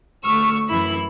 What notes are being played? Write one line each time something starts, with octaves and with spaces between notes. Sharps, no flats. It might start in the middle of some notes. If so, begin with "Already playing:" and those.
D2 C#6 E6 F6
F#2 E3 E4 B5 E6